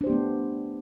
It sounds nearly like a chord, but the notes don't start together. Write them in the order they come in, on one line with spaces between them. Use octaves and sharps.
D4 C5 G4 B3 A3